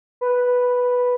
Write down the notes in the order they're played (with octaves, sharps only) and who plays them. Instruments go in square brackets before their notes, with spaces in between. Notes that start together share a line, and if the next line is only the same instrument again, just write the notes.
[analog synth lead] B4